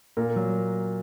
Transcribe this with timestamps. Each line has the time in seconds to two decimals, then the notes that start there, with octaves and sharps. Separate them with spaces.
0.17 A#2 A#4
0.36 F#3